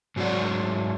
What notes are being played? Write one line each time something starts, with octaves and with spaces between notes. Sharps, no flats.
G#2 F#3 G4 D5 F#5